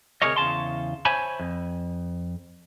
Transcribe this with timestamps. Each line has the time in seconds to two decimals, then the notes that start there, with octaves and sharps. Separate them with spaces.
0.22 D2 C3 G#4 A#4 C#5 D#5
0.36 E2 C#3 A5 C6
1.05 C5 C#5 E5 G#5 A5 B5
1.40 F2